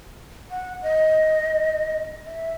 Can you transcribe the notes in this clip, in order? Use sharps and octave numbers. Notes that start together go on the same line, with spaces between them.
F#5
D#5
E5